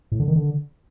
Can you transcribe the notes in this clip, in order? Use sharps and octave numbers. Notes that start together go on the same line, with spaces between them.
A2
D3
D#3
D3